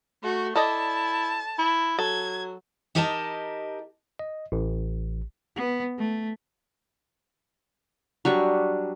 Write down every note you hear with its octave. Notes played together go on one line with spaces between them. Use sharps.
A3 F#4
E4 A4 D5 D#5 A5
E4
F#3 A4 G#6
D#4 G4 A#4 D#5 G#5 A5
D#5
A1
B3
A3
F#3 G3 D4 C#6